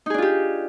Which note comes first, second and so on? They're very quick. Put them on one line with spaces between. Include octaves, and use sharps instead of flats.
D#4 G#4 D4 F4 G4